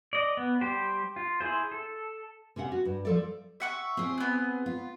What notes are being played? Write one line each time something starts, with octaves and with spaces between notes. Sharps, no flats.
D5 D#5
B3
G3 G4 C5
F4
E4 G#4 C5
A4
C3 C#4 G4 F#5
F#4
G2
F3 A4 D5
E5 F#5 C#6
C4 F4 G#4
B3 F#6
F4